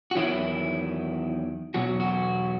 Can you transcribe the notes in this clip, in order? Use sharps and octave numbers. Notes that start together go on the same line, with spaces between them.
F#4
E2 D#3 F#3 E4
E2 B2 F#3 F#4
F#4